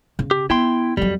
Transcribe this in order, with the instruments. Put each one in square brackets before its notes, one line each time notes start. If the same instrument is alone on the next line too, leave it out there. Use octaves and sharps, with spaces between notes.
[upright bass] C#3
[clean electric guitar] G4
[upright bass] B3 [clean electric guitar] E4 G5 C6
[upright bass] F2 F#3 [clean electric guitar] G3